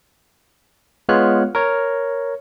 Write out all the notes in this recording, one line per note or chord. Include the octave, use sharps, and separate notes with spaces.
G#3 B3 F4 C#5 F6 F#6
A#4 C#5